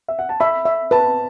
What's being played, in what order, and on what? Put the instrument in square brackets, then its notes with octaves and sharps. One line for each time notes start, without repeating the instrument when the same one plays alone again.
[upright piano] E5
F#5
A5
[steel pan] E5 [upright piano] B5
[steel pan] E5
[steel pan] B4 [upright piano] A5